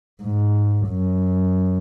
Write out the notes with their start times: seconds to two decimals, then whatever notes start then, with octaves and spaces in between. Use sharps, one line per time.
0.23 G#2
0.88 F#2